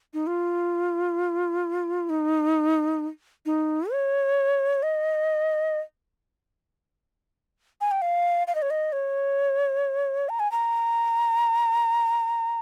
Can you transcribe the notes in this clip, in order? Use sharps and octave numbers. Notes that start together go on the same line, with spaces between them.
D#4
F4
D#4
D#4
C#5
D#5
G#5
G5
F5
F5
D#5
C#5
D#5
C#5
A#5
G#5
A#5